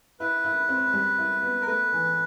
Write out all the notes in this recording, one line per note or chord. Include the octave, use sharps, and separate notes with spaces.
E4 B4
E4
C4
G3
E4
B3
A#4
A3 B4
E3